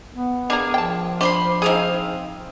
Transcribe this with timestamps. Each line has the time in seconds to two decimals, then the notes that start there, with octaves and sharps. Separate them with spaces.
0.12 B3
0.50 A#3 D4 G#4 G#5 A#5
0.74 F3 G5 A5
1.21 D4 C5 B5 C6
1.62 C4 D#4 G#4 F5 D#6